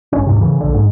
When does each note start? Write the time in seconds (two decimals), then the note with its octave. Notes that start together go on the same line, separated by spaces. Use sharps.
0.12 G1 C#4
0.26 D#2 G#2 C3
0.41 C#3 E3
0.60 A#1 D3
0.74 G#2